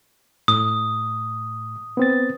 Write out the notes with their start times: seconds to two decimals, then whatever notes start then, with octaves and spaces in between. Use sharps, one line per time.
0.48 A2 D#6
1.97 B3 C4 A6